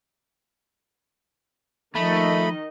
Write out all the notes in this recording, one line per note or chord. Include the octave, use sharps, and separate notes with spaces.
D#3 F3 A3 D#4 D#5 B5